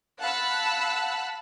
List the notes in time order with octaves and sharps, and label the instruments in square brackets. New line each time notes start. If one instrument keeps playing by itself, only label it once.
[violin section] F5 F#5 A5 B5 E6 F#6